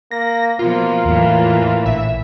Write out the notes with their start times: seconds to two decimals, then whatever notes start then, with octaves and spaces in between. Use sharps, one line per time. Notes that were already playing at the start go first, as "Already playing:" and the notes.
0.11 A#3 A#6
0.59 B2 F3 A#3 F4
1.05 E2 A2 E3
1.86 A#1 E5